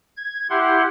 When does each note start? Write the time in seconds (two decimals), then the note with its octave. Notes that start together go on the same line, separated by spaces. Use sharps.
0.17 G#6
0.50 E4 G4 F#5 C6